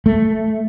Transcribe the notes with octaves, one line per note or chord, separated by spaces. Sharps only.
A3